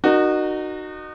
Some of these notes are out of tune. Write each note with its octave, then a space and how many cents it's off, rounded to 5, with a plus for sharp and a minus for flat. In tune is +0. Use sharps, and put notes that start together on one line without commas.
D#4 -30 F#4 +0 A#4 +0